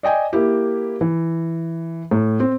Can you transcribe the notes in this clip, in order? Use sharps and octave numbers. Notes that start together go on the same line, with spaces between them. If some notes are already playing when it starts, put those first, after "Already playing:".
D5 D#5 G5 G#5
A#3 E4 G4
E3
A2
C4